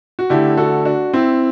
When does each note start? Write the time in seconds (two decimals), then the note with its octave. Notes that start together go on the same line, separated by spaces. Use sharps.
0.19 F#4
0.30 D3 A3 E4 G4
0.57 F#4 A4
0.85 D4 F#4
1.14 C4 E4